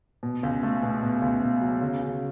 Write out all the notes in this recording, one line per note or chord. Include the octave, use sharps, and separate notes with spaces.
B2
C#2
A3
B2
B2
C#2
B2
F#3
C#3
C#3